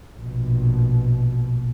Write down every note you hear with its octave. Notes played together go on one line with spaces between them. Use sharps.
A#1 B2